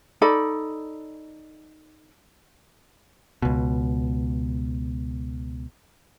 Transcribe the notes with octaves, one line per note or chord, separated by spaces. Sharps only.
D#4 A4 D5 B5
C#2 B2